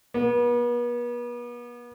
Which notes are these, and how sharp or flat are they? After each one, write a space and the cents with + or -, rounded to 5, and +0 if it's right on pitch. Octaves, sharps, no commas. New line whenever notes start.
B3 -40